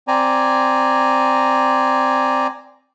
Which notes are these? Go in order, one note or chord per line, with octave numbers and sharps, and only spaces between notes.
C4 D5 G#5 A#5